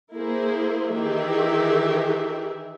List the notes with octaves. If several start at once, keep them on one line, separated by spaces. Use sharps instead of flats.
A#3 E4 G#4 C5
D#3 E3 G4 G#4 E5